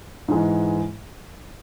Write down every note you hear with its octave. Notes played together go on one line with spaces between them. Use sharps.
G#2 E3 G#3